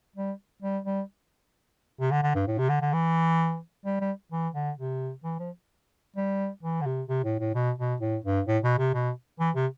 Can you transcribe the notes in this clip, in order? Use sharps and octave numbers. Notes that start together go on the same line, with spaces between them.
G3
G3
G3
C3
D3
D3
G2
A2
C3
D3
D3
E3
G3
G3
E3
D3
C3
E3
F3
G3
E3
D3
C3
C3
A2
A2
B2
B2
A2
G2
A2
B2
C3
B2
E3
C3